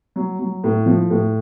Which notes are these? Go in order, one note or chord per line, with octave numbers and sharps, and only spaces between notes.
F#3
F#3
A2
F3
A2